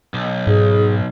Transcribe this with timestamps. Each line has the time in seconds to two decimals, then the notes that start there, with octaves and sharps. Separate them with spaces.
0.14 B1
0.47 G#2 G#4